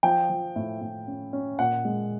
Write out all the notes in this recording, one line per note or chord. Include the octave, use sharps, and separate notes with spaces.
F3 G5
F3
A2
A2
C#4
C#4
A#2 F#5
G#3